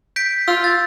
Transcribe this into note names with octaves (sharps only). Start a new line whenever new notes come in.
G6 B6 D7
F4 E6
A6